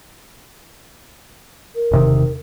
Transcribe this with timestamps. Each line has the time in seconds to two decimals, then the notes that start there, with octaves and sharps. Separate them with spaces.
1.75 A#4
1.91 E1 C3 D#3